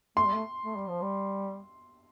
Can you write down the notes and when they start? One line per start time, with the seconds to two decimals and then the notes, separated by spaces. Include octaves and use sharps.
0.17 A3 C6
0.26 G3
0.34 A3
0.65 A3
0.77 G3
0.89 F3
1.02 G3